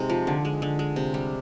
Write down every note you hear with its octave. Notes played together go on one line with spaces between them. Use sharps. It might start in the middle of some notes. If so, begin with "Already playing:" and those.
Already playing: C3 G#3 D#4
F3
D3
G#3
D3
G#3
C3
G3